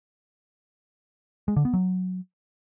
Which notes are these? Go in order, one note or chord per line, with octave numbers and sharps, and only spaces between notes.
G#3
D3
B3
F#3